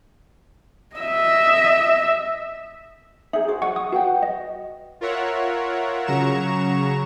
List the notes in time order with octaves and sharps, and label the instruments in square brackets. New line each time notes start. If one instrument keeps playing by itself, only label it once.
[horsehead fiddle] D#5 E5
[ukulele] D#4 G#4 [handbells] E5
[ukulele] F#4 G#4 C5
[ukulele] D#5 [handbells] F#5 C#6
[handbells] D#6
[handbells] F#4 [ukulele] B4 F#5 G5
[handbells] D#5
[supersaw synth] F4 A#4 C#5 E5 F#5
C#3 F#3 A#5 C#6 E7